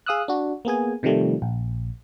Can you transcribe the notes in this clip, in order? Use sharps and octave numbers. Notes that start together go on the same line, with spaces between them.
G#4 F5 D#6 E6 F#6
D4 F#4
A#3 B3 G#4 G#5
C3 D#3 F3 G3 A3
A#1